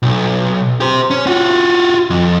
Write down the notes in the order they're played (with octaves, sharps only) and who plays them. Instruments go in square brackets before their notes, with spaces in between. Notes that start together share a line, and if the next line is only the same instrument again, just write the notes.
[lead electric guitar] B1
G4 C5
C#4
F4 F#4
F2